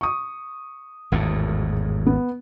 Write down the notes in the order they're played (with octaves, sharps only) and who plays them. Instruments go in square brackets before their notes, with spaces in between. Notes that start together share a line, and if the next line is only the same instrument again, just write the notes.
[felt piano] C#6 D#6
[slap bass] G#1 E2 A2
[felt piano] B3